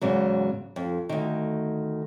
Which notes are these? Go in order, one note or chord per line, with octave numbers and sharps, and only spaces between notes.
E2 G#2 C#3 F#3
F2
D2 D#3